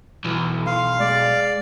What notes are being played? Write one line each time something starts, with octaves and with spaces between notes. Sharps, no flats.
B1 E3
F5 C6
G#3 D5